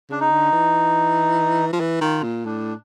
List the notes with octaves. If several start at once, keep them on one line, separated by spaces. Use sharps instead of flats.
C#3 D4
D#4
D3
E3
F3
E3
D#3 F4
A#2
A2 D4